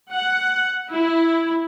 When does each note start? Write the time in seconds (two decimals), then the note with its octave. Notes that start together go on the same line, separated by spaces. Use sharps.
0.11 F#5
0.90 E4